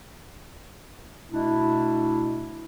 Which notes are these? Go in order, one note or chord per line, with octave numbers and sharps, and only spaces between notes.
B2 A3 D4 E4